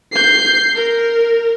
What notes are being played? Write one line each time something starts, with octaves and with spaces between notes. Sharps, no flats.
G6 C7
A#4